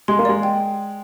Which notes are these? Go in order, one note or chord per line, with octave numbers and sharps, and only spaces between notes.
G#3 C6
A#3
G#3 D5
G5